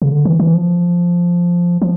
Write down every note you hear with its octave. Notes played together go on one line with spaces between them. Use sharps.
C#3
D3
E3
E3
F3
F3